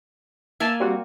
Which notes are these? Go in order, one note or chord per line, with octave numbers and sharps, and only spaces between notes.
A#3 E5 G#5 A5
G3 C4 F#4